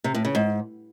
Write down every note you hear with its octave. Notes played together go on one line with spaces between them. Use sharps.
C3
A2
C#3
G#2